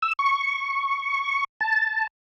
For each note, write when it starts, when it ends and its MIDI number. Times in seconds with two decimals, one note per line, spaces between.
0.02 0.13 88
0.19 1.44 85
1.61 2.07 81